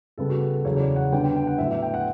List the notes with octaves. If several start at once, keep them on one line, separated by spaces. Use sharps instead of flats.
C#3 G3 B3 A4
F#4
F#4
A4
E2 C#3 F#3 C#5
C#5
D5
F#5
D3 G3 B3 D4 G5
G5
G5
F#5
A2 F#3 B3 E5
E5
G5
F#5